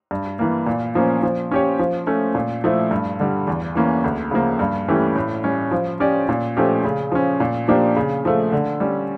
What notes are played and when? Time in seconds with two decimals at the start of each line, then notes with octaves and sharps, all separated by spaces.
0.11 G2
0.39 E3 A#3
0.66 A#2
0.95 F3 A#3 C#4
1.23 F3
1.51 C#4 G4 C#5
1.79 F3
2.07 A3 C#4
2.35 A#2
2.64 F3 A3 E4 A4
2.91 G2
3.20 D3 G3
3.47 E2
3.75 E3 A#3 C#4
4.04 D2
4.31 C#3 F3 A#3
4.59 G2
4.88 E3 A3 C#4 G4
5.16 A2
5.44 G3 C#4
5.71 F3
6.00 C#4 G4 D5
6.29 A#2
6.57 F3 A3 C#4 G4
6.85 C#3
7.12 F3 C#4
7.40 A#2
7.68 F3 A#3 D4 G4
7.96 C#3
8.25 F3 A3
8.52 D3
8.80 G3 C#4